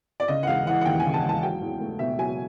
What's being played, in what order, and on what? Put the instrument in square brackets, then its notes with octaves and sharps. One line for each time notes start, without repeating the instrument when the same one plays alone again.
[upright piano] D5
C#3 D#5
F#5
E1 F5
E3 F#5
F#5
D#2 G5
C#3 G#5
A5
E1
A5
F#3 G5
E2
A3
B2 E5
F#3 G#5